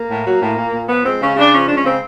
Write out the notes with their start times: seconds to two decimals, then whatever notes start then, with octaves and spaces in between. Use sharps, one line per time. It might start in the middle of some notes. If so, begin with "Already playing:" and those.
Already playing: A#3
0.09 A2
0.25 F#3
0.41 A2
0.57 A#2
0.73 A#2
0.89 F3 B3
1.04 G#3 C4
1.20 C#3 C#4
1.36 C#3 D4
1.52 F3 C#4
1.67 G#3 D4
1.76 C#4
1.84 C#3 C4